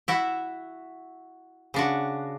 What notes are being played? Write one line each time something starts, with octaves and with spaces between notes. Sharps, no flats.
E4 F#4 E5
C#3 D4 F#4